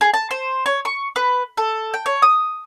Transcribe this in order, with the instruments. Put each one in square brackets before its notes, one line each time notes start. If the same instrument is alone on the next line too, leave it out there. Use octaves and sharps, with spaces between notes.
[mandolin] G#4
A5
C5
C#5
C#6
B4
A4
G5
C#5
D#6